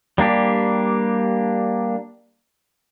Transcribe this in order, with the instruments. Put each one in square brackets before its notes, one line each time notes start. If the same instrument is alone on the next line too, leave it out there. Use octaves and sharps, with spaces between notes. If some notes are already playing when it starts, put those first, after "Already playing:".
[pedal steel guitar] G3 A#3 D4 G4